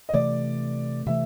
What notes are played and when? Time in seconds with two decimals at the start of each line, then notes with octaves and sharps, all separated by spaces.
0.09 D#5
0.13 C3 E3 A3 D5
1.07 C3 E3 A3 E5